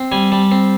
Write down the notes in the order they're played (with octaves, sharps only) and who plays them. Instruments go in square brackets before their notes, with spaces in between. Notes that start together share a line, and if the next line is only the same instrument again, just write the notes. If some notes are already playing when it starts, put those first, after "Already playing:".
Already playing: [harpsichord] C4
G3 G#5
G3 A5
C4